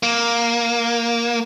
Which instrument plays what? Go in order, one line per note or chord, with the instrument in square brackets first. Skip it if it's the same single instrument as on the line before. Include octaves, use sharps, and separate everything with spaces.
[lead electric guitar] A#3